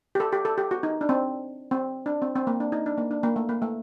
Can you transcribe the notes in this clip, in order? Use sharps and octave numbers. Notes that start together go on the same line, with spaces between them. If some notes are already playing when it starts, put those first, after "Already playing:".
G4
A4
G4
A4
G4
F#4
D#4
D4
C4
C4
D4
C4
C4
A#3
D4
D#4
D4
A#3
D4
A#3
A3
A#3
A3